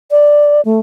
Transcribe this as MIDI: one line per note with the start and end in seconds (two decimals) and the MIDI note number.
0.11 0.61 74
0.65 0.80 57